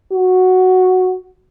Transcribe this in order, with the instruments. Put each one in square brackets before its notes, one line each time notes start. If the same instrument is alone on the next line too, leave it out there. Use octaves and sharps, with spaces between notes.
[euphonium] F#4